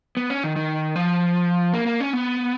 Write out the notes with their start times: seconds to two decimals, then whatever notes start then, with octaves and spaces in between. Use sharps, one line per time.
0.17 B3
0.30 C#4
0.44 D#3
0.56 D#3
0.96 F3
1.73 A#3
1.86 A#3
2.00 C#4
2.13 B3